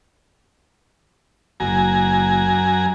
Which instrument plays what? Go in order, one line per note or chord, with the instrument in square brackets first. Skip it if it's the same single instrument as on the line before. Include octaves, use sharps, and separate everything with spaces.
[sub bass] F#1 [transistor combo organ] F#2 G#5 A#5